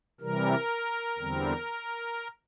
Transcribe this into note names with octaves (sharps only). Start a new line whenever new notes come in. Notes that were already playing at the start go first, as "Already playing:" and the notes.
C3 E3 G3 A#4
E2 D3 G3 C4